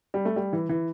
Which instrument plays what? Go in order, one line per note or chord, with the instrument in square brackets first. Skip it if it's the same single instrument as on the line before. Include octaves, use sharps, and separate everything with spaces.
[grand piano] G3
A3
G3
E3
E3